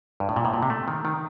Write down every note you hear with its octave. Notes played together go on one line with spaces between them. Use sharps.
G2
A2
A#2
A2
A#2
C3
A3
D#3
D#3